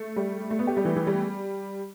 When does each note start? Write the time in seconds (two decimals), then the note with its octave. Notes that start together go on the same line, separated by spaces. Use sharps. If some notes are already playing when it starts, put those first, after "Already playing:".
Already playing: A3
0.16 G3
0.51 A3
0.59 B3
0.67 G4
0.77 G3
0.85 E3
0.96 E3
1.07 G3